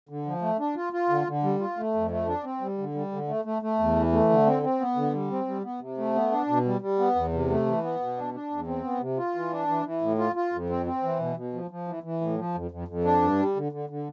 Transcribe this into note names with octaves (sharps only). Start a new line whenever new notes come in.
D3
F3
A3
D4
F4
F4
D3
D3
G3
F4
A3
F2
A3
D4
C4
G3
D3
G3
D3
A3
A3
A3
E2
E3
A3
D3
C4
C4
B3
D3
G3
C4
G3
B3
C3
A3
B3
D4
B2
G3
G3
B3
E2
C3
A3
E3
B3
B2
D4
D4
E2
C4
B3
C3
F4
E3
D4
E3
E3
A2
F4
F4
F2
C4
C4
E3
B2
B2
F3
F3
E3
E3
A2
F3
F2
F2
F2
D4
G2
G3
D3
D3
D3